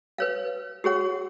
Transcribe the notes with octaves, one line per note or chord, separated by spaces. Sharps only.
B4 C#5 F5
F#4 G#4 C#5 F#5